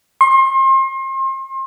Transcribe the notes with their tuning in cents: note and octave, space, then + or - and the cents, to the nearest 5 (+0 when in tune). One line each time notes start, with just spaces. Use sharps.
C6 +35